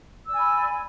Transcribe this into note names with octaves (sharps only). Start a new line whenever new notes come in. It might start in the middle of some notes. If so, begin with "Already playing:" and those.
D5 G#5 B5 E6